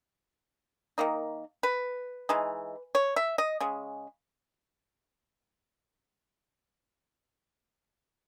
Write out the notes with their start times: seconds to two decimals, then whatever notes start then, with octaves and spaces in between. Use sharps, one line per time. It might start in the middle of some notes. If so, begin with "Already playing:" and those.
0.98 D#3 A#3 D#4
1.63 B4
2.29 E3 G#3 D#4
2.95 C#5
3.16 E5
3.38 D#5
3.60 C#3 G#3